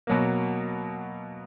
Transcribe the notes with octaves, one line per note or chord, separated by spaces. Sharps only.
B2 F#3 A#3